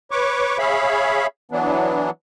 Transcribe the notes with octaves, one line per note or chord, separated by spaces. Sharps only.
B4 C#5 C#6 D6
G#4 C#5 E5 F5 B5
E3 F#3 B3 D4